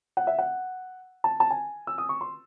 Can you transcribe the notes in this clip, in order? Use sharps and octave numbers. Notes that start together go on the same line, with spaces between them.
F#5
E5
F#5
A5
A5
G#5
E6
D#6
C#6
C6